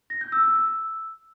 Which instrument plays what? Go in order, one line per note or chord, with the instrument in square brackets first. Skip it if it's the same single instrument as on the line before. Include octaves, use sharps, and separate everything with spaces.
[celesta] A#6
G6
E6
E6
E6